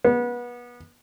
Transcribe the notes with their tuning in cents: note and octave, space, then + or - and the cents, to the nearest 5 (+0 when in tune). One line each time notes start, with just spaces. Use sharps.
B3 -30